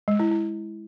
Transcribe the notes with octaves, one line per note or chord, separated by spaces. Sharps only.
G#3
E4
E4